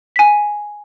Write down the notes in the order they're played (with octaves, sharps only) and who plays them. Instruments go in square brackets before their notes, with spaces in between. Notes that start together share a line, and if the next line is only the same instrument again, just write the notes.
[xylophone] G#5 B6